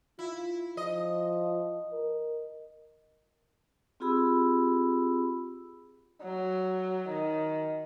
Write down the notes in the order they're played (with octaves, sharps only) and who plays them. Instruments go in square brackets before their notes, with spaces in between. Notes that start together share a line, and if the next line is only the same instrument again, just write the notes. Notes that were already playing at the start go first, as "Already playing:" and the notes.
[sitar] E4 [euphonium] F4
[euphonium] F3 [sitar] D#5
[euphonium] A#4
[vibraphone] C4 F4 G4 G#4 B5 E6
[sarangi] F#3
D#3